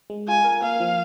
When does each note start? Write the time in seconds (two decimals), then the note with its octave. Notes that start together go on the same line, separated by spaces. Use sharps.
0.10 G#3
0.28 F4 G#5
0.44 A#4
0.62 A#3 F5
0.80 F3